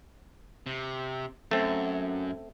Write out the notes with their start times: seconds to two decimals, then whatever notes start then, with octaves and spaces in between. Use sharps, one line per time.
0.66 C3
1.51 F#2 A3 C4